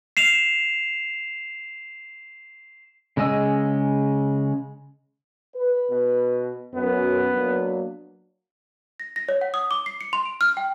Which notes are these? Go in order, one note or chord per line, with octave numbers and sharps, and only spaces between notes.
C7 E7 F7
C#3 G#3 D#5 G#5 E6
B4
B2
F#2 B3
F#3 A#3 D4
A#6
A#6
C#5
F#5
D#6
D6
C7
C#7
C6
D7
F6
G5